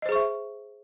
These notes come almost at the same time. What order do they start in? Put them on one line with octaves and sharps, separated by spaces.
D#5 C5 G#4 C#6 E5